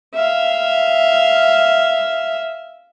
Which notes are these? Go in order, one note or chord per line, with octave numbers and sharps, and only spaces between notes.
E5 F5